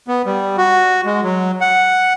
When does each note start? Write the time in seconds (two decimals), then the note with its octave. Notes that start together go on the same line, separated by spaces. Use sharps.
0.08 B3
0.26 G3
0.58 F#4
1.06 G#3
1.24 F#3
1.61 F#5